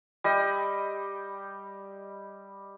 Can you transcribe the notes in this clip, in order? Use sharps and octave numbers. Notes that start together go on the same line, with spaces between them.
G3 D#5 G5